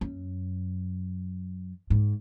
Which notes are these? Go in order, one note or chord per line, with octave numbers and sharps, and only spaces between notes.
F#2
G#2